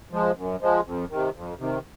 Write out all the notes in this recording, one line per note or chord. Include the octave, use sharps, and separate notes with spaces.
F3 G#3
F#2
F3 G#3
F2
C3 D#3
F2
C3 D#3